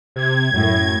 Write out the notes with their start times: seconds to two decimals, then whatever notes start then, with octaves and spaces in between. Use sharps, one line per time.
0.16 C3 G#6
0.54 F#2 A2